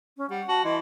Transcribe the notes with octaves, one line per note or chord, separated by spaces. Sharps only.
C#4
G3 F#5
F#4 A5
E3 D#5 C6